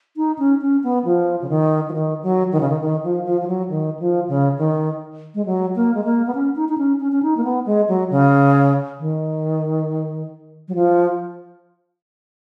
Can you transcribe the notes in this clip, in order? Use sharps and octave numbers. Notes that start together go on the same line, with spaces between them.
D#4
C#4
C#4
B3
F3
C#3
D#3
F3
D#3
F#3
D#3
C#3
D#3
D#3
F3
F3
F3
F#3
D#3
F3
C#3
D#3
G#3
F#3
A#3
G#3
A#3
B3
C#4
D#4
D#4
C#4
C#4
C#4
D#4
A#3
B3
G#3
F#3
C#3
D#3
F#3
F3